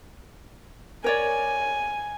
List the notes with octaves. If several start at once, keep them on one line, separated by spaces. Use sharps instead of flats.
A#4 C#5 D5 G#5